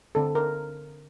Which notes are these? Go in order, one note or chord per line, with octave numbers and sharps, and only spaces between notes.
D3 A3 C4 A4
A#4